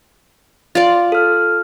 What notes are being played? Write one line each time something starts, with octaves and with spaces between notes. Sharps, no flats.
F4 D5
A4 F6